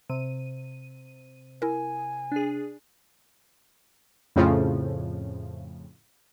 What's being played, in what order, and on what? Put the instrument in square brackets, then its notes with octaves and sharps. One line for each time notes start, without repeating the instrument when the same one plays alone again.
[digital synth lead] C3 [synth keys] D#7
[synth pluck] E4 A#4 [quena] G#5
[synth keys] D4 G#4
[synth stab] F2 A2 C#3 F3